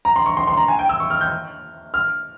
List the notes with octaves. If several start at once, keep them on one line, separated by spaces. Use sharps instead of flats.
A#5
C6
C#6
C6
C6
A#5
G#5
G5
E6
C#6
F6
G6
F6